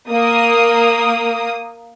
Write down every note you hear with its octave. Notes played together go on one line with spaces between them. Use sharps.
A#3 D#6